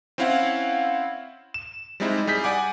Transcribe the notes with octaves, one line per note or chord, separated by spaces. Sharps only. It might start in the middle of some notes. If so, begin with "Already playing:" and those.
C4 C#4 E4 F5 F#5
E7
G3 G#3 C4 D#4 E4
G3 G#4 G6 B6
D5 F#5 G#5 D6